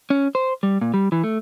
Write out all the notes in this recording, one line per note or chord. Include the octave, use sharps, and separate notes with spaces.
C#4
C5
G3
A#2
G3
E3
A3